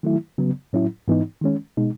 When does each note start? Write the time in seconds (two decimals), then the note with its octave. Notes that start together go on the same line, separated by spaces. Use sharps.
0.03 D#3 F#3 A3 E4
0.38 C#3 F#3 B3
0.73 A2 F#3 C#4 E4
1.08 G#2 E3 B3 D#4
1.42 D#3 G#3 C#4
1.77 B2 G#3 D#4